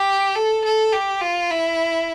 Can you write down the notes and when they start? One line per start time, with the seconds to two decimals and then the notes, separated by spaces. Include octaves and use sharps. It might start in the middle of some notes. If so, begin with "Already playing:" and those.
Already playing: G4
0.35 A4
0.65 A4
0.93 G4
1.21 F4
1.51 E4